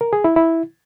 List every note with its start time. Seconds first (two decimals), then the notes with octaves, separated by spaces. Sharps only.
0.01 A#4
0.13 G#4
0.24 E4
0.36 E4